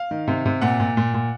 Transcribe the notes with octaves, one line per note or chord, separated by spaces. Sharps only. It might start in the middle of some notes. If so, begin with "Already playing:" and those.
Already playing: F5
D#3
C3
C3
A#2 F#5
A#2
A#2
A#2